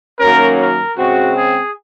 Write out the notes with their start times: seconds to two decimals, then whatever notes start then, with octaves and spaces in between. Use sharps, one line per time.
0.20 F#2 D#3 F#3 A#3 C#4 A#4
0.58 A#4
0.97 C#3 G#3 C4 F#4
1.35 G#4